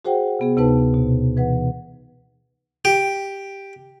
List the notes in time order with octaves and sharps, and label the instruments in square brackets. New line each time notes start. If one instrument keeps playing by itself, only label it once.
[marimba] F#4 G#4 C5 F#5 G5
C3 B3 G#4
D2 C3 B3 D#4 B4 A5
B2
E3 B4 F#5
[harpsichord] G4